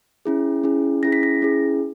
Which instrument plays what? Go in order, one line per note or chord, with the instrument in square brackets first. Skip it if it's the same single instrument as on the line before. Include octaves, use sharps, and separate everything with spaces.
[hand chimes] C#4 E4 G#4
C#4 E4 G#4
C#4 E4 G#4 A#6
B6
A#6
C#4 E4 G#4